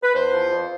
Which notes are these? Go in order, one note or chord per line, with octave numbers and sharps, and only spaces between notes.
B4
E2 C5
F3
F2